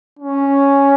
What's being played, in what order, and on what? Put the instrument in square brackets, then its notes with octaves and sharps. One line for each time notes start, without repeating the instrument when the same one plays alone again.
[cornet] C#4